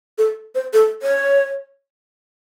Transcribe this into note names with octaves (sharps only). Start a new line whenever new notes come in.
A4
C5
A4
C#5